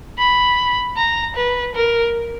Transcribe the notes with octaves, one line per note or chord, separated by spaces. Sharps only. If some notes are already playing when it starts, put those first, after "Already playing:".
B5
A#5
B4
A#4